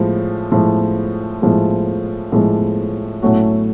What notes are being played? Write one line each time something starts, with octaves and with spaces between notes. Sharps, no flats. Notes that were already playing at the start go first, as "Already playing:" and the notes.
Already playing: A2 F3 G#3
A2 F3 G#3
A2 F3 G#3
A2 F3 G#3
A2 F#3 A3 C#4 F#4